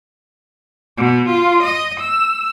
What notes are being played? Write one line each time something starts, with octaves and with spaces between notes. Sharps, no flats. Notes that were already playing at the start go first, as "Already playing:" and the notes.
B2
F4
D#5
E6